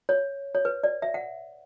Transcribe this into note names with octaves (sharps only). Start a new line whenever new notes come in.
C#5
C#5
B4
D5
E5
F#5